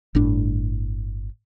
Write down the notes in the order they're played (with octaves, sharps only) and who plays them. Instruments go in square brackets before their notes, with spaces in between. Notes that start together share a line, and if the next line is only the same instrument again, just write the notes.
[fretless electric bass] G1 A2 D4